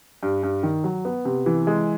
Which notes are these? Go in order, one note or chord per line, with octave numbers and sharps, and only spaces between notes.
G2
G2
D#3
F#3
B3
C3
E3
G#3